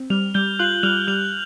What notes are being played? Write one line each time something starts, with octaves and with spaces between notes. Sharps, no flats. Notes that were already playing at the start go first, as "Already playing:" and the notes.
Already playing: C4
G3 F6 F7
G3 G6 G7
F4 F#6 F#7
G3 F6 F7
G3 F6 F7